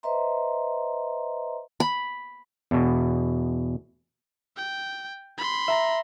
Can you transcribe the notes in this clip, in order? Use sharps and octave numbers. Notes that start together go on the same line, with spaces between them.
B4 C5 D#5 E5 A#5 C6
B5
E2 B2
G5
B5 C6
E5 A#5 A#6